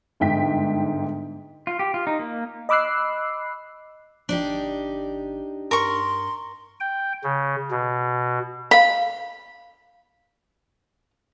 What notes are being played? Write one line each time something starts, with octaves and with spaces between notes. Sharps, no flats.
G1 G#2 G5 B6
F4
G4
F4
D#4
A#3
D#5 B5 D6 E6 F#6 C7
G1 D4 D#4 G4
G2 A#4 C6 C#6
G5
C#3
B2
D#5 F5 B5